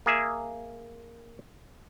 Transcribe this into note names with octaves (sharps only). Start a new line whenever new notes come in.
A#3 G#4 E5